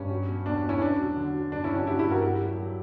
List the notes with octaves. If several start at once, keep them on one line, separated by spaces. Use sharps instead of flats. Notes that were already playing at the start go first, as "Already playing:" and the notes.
Already playing: G2 C#4
F#3
B2
E2 D4
B2
C#4 E4
E2 D4
F#3
D3
F#3
G2 D4
C#4 E4
F#3
D4 F#4
F#3 E4 G4
E4 G4
G2
F#4 A#4
F#3 E4 G4
F#3
F#3